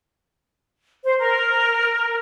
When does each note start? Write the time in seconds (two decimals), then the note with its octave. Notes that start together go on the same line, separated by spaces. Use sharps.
1.04 C5
1.19 A#4